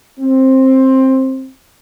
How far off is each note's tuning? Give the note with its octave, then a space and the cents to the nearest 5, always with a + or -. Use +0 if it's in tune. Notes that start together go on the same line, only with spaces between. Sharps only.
C4 +15